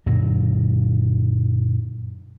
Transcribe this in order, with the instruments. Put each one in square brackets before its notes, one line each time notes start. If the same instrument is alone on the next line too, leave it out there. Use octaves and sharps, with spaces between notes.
[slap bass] F#2 A#2 D3 F#3